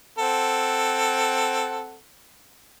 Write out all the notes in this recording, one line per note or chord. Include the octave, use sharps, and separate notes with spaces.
C4 A4 F#5